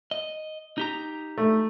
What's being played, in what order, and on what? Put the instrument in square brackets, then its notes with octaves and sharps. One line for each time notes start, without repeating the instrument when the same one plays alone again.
[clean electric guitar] D#5
D#4 G4 A#5
[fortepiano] A3